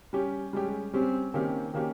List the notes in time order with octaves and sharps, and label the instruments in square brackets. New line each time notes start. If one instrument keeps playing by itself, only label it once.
[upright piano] G3 C#4 G4
[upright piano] G3 C#4 G4 [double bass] G#3
[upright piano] G3 C#4 G4 [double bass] C4
[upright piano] D#3 A#3 C#4 G4 [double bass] C4
[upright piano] D#3 A#3 C#4 G4